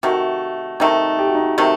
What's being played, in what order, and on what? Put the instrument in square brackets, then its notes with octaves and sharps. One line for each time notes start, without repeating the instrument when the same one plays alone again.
[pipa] C3 D#3 A3 [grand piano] F#4
[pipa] C3 D#3 A3 [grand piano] D#4
[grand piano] G4
F#4
D#4
F#4
[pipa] C3 D#3 A3